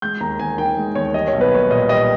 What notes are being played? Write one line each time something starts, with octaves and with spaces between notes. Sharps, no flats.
G#3 G6
D#2 A#5
D#2 G#5
D#3 G5
G#3
D#2 C#5
G3 D#5
C#5
B1
B4
A#3 C#5
A#2 D#5
G3 D#5